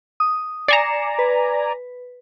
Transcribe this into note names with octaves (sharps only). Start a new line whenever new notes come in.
D#6
D5 G#5 A#5 C7 C#7 E7
B4